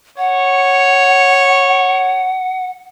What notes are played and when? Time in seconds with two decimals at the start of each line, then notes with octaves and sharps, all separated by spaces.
0.18 C#5 F#5